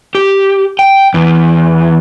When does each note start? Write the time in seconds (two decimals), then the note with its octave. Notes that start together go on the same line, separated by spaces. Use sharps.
0.15 G4
0.79 G5
1.14 E2